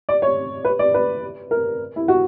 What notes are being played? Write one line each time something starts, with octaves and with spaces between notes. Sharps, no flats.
D5
C#5
B4
D5
B4
A#4
E4
F#4